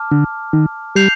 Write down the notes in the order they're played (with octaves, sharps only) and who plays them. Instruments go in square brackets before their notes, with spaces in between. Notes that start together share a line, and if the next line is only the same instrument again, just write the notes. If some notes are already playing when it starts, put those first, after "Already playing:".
Already playing: [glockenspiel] A5 D6 F6
[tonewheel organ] D3
D#3
[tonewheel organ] G3 [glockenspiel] G6 C7 F7